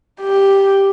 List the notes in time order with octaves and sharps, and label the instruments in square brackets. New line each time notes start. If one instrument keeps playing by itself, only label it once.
[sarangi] G4